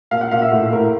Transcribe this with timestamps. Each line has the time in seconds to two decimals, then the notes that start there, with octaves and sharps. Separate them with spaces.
0.11 A#2 F5
0.21 F#5
0.31 A#2 F5
0.42 E5
0.52 A2
0.72 A2 A#4